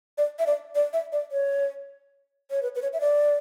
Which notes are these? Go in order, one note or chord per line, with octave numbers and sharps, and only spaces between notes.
D5
E5
D5
D5
E5
D5
C#5
C#5
B4
B4
C#5
E5
D5